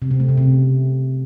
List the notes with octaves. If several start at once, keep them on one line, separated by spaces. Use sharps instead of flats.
C3
C4
A3
C#3
C3